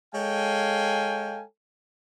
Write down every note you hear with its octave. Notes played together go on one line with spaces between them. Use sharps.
G#3 A4 C#5 F5 G5 G#5